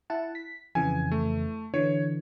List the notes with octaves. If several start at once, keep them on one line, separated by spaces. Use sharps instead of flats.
E4 F#5 A5
B6
F2 C#3 E3 G#5
A3
D3 E3 C#5